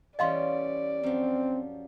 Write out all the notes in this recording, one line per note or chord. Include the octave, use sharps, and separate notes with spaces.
E3 G3 C#4 D5 D#5 F5 C6
F#2 F3 C4